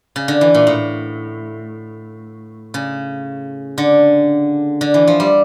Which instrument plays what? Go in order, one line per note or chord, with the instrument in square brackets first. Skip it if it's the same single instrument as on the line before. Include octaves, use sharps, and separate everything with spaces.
[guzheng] C#3
D3
E3
A#2
A2
C#3
D3
D3
E3
F3
G3